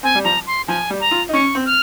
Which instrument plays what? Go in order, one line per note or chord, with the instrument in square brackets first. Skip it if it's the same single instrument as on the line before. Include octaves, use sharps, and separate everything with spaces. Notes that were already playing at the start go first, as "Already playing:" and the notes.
[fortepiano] C4 [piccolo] G#5
[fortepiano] G3
[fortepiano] F3 [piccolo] A#5
[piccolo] C6
[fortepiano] F3 [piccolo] G#5
[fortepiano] G3
[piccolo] A#5
[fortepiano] F4
D#4
[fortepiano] C#4 [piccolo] C#6
[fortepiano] C4
[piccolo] F6